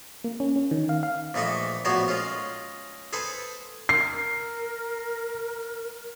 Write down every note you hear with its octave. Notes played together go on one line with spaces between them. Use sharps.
A#3
C#4
C#4
D#3
F5
F5
A#1 E3 A3 A4 D#5
A#1 A2 B3 F#4 C5 C#5
G#3 C#4 F4
G#4 A4 B4 C5
A#4 C7